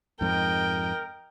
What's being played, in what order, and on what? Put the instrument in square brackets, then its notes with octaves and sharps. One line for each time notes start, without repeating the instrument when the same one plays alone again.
[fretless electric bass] F2 G#2 [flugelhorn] A#4 [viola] D#5 G5